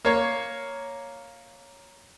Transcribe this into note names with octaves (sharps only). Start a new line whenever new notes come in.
A#3 C#5